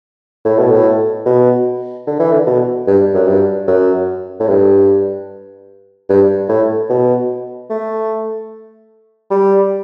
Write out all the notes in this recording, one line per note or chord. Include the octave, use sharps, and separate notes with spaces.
A2
B2
A2
B2
D3
E3
D3
B2
G2
F#2
G2
F#2
A2
G2
G2
A2
B2
A3
G3